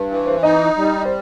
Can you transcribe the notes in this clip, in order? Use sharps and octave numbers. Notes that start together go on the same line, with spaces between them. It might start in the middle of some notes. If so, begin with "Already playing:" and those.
Already playing: G2
E3
C5
D#4 D#5
G3
C5